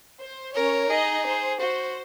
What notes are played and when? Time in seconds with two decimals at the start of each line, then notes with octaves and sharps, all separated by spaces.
0.21 C5
0.55 C#4 A#4 C#5
0.90 D#4 G#4 D#5
1.25 C5
1.60 F#4 C5